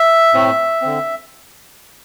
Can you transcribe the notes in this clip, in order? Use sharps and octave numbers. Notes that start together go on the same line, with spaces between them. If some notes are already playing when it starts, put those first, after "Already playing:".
Already playing: E5
A2 A3 C4
D3 C4